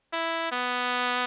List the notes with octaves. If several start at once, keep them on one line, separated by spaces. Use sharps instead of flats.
E4
B3